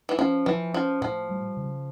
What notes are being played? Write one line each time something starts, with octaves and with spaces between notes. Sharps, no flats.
E3
F3 C#4
E3 F3
F3 C#4
A2 F3
G3
C#3